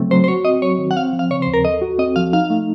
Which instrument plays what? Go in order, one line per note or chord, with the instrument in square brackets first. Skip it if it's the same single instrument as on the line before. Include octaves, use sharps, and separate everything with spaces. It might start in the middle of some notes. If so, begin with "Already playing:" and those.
Already playing: [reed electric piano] C#3 F#3 A3 C4
[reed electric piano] F#3 [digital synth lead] C5
[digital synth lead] C5
[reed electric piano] F#4 [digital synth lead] C#5
[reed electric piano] C4 [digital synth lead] D#5
[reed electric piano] F#3 [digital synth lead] C#5
[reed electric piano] D#3
[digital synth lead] F#5
[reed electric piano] C4 [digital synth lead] F5
[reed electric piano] F3
[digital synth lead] F5
[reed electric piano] C#3 [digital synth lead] C#5
[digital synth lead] C5
[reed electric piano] D#2
[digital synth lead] A#4
[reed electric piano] A4 [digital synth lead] D#5
[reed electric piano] F#4
[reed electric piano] C4 [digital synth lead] D#5
[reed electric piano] F3 [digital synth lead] F5
[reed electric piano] D#4 [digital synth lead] F5
[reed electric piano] A3